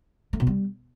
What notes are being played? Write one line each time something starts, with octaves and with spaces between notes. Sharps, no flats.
A3
B2
G3